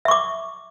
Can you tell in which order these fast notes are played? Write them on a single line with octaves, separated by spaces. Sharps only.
E5 C#6 D6